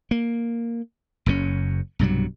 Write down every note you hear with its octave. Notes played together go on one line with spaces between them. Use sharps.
A#3
F#1 F#2 C#3 C#4
B1 G2 C3 F#3